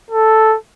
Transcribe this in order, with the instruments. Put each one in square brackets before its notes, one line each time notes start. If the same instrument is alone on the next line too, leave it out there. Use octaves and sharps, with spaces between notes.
[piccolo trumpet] A4